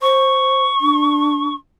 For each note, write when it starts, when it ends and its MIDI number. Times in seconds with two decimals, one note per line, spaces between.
0.02 0.63 72
0.02 1.54 85
0.81 1.50 62